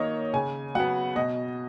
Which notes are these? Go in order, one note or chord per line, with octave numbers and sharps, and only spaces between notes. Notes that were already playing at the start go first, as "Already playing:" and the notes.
Already playing: D#3 A#3 C#5 D#5
C#3 G#5
F#3 B3 F#5
B2 D#5